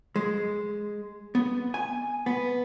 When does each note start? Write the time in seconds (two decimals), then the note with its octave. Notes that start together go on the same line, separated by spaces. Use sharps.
0.16 G#3
1.35 B3
1.74 G#5
2.26 B3